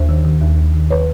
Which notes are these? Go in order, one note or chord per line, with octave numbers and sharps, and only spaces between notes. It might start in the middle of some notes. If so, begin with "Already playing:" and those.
Already playing: D#2 C5
D#3
D#3
D#2
D#2
D#3
B4 C#5